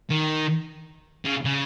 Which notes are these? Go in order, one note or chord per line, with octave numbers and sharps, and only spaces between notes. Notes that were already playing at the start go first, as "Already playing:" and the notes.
D#3
C#3
C#3